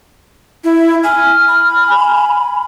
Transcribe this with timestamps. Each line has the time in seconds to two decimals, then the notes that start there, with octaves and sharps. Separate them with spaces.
0.64 E4
1.04 G#5 F6
1.48 B5
1.87 G#5